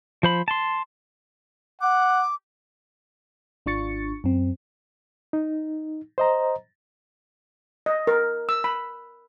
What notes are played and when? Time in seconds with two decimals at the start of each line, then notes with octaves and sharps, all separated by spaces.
0.23 F3 C5 B5
0.48 A5 C6
1.81 F#5 D6
3.66 G#1 D4 F4 C#6 A6 C#7
4.24 F#2 C4
5.33 D#4
6.18 C5 D#5 A#5
7.86 D#5
8.07 A#4
8.49 E6
8.64 B5